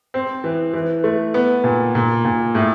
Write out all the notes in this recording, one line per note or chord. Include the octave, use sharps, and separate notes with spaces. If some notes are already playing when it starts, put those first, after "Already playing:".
C4
E3
E3
A3
B3
A#2
A#2
A#2
A2